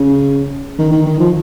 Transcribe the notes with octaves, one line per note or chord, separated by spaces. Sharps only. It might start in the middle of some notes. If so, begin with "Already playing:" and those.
Already playing: C#3
D#3
D#3
D#3
F3